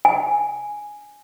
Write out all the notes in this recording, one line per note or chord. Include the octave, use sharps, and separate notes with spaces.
G#5